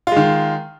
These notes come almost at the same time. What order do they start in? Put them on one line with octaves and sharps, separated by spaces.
F4 G#3 D#3